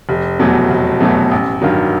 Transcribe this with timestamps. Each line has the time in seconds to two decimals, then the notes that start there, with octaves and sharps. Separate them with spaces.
0.09 F1
0.39 E2 B2 F#3 A3
0.71 F1
1.00 E2 B2 F#3 A3
1.31 A1
1.62 G2 D#3 F#3